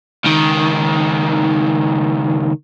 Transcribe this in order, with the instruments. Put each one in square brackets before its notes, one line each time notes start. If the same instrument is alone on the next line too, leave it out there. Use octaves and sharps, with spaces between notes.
[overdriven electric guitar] C#2 D#3